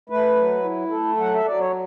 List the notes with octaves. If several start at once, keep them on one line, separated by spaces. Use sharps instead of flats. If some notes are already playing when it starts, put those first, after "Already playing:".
A3 B4
F#3
E4
A3 A4
F#3 F#5
E5
F#3 D5
C#5